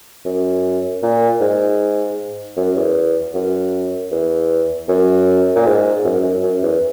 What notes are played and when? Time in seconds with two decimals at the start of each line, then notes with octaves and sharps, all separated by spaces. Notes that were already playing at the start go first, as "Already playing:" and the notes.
0.25 F#2
1.03 A#2
1.41 G#2
2.57 F#2
2.76 E2
3.34 F#2
4.11 E2
4.89 F#2
5.55 A#2
5.66 G#2
6.05 F#2
6.24 F#2
6.43 F#2
6.63 E2